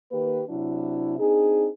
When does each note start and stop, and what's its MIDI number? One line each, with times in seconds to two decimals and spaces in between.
0.12 0.42 51
0.12 0.42 58
0.12 0.42 67
0.12 0.42 71
0.49 1.18 48
0.49 1.18 54
0.49 1.18 62
0.49 1.18 64
1.19 1.68 60
1.19 1.68 62
1.19 1.68 63
1.19 1.68 68